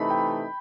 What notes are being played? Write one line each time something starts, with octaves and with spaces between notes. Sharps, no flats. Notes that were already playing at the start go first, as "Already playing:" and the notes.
Already playing: C3 E3 A3 D#4 B5
G5